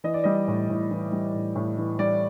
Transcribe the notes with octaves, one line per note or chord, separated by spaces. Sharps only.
E3 D#5
D5
G3 D#5
A2
A2
E3
G3
A2
A2
E3
G3 D5